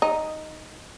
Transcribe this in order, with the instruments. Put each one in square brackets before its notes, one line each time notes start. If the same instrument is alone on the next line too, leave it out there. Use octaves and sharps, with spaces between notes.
[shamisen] D#4